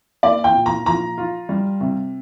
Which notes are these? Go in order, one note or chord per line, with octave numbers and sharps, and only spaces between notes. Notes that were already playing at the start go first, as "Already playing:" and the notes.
A#3 D5
G5
A#2
A#5
F3 A#5
F4
G3
C3